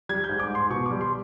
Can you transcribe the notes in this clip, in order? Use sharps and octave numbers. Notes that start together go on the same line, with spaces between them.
G3 G#6
G6
G#2
D6
G#2
C6
B2 C#6
G3 D6
C6